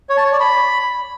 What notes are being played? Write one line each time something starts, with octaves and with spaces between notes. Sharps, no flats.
C#5
A5
C#5
D5
B5